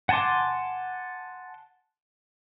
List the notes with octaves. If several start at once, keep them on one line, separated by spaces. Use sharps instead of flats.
F#5 G#5 A5 C6 D6